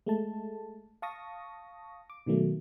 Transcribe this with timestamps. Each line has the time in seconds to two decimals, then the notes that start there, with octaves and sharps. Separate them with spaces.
0.06 G#3 A3 A5
1.02 F5 A5 C#6 D#6 A#6
2.10 D6
2.26 B2 D#3 F#3 A3